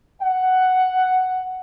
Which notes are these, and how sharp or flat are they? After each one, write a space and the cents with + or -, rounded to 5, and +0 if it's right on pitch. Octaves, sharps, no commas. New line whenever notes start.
F#5 +5